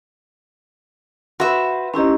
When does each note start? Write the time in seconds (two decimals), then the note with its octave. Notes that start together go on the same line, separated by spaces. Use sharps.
1.40 F#4 B4 C5 E5
1.94 C#4 D#4 E4 G4 C#5 C6